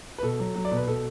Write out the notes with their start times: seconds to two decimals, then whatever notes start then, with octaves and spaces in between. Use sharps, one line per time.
0.18 B4
0.23 B2 A4
0.40 F#3
0.56 F#3
0.65 D5
0.72 B2
0.77 B4
0.87 B2 A4